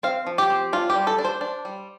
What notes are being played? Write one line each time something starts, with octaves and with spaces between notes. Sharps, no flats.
C4 F5
F3
G4
C4
D4 F4
G4
G3
A4
D4
C5
D4
G3